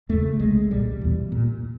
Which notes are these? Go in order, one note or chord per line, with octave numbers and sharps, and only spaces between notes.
E2 C#3 A3
C2 C3 G#3
C2 A#2 G3
E2 B2
A#2